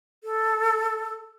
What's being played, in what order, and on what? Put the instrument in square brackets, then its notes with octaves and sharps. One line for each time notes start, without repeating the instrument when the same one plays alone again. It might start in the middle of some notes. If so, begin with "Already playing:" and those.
[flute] A4